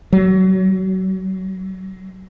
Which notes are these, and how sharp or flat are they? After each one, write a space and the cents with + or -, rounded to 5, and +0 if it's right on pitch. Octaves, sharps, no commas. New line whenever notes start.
F#3 +30